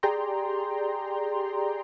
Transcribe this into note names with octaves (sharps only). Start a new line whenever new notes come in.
G4 G#4 D5 G5 A#5 C6